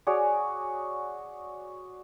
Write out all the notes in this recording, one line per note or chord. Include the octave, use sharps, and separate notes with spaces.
F#4 G#4 C#5 D5